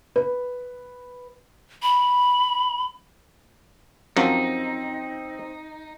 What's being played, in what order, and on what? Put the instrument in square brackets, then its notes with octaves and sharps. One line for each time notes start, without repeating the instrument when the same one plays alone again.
[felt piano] B4
[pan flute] B5
[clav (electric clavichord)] F#2 F3 F#3 [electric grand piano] C4 [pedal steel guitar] D#4